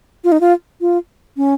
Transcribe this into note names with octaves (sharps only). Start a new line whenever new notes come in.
F4
D#4
F4
F4
C#4